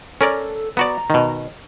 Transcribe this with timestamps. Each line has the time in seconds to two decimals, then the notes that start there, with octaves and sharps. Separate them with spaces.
0.21 C#4 A4 A#4 D5
0.77 B3 F#4 D5 A#5
1.10 B2 D#3